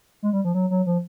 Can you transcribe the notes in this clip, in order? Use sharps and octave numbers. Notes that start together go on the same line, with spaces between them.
G#3
G3
F3
F#3
F#3
F3